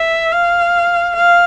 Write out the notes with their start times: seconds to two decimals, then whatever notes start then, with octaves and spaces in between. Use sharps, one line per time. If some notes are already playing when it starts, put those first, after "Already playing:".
Already playing: E5
0.32 F5
1.16 F5